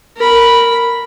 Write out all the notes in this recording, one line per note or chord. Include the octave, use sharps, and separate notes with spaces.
A#4 B5